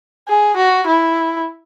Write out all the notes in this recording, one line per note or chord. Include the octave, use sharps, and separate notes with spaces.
G#4
F#4
E4